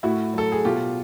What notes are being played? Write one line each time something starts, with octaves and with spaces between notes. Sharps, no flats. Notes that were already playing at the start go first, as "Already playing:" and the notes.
A2 E4 F#4
F#3 A4
G#4
B2 F4 G4